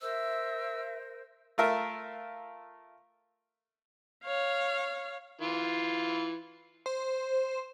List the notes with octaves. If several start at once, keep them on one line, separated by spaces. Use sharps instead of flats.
A#4 C5 E5 E6
A3 F4 A#4 E5
C#5 F5
E3 F4
C5